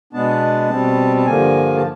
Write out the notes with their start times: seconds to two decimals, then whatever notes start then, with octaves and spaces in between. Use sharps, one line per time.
0.13 B2 G#3 B3 D4 A5
0.70 B2 G3 C4
1.17 A5
1.25 G2 D3 F3 A#3 G#5
1.77 A5